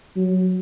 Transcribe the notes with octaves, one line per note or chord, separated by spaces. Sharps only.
F#3